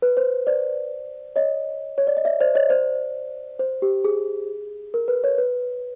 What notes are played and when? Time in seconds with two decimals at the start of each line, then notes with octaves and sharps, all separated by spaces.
0.02 B4
0.17 C5
0.47 C5 D5
1.36 C#5 D#5
1.98 C#5
2.07 D5
2.17 D#5
2.25 D5 E5
2.40 C5 D5
2.55 C#5 D#5
2.70 C5 D5
3.59 C5
3.82 G4
4.05 G#4
4.94 A#4
5.08 B4
5.24 C#5
5.38 B4